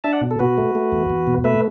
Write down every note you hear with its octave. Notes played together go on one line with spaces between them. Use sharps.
D4 E5 A5
D5 F#5
B2
A4
B2 F#4 B4
A3
A3
E2
E2
B2
A3 B4 E5